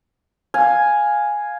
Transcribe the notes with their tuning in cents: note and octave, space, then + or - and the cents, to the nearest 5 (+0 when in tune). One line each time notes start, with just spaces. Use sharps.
F5 +10 G#5 +0